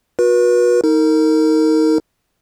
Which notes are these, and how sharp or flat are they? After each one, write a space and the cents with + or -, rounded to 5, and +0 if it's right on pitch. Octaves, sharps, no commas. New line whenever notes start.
F#4 -35 B4 -35
D#4 +25 A#4 -30